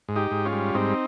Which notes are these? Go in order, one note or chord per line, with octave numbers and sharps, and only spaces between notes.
G#2
D#4 G4
G#2
C#4 F4
G3
G#2 C4 D#4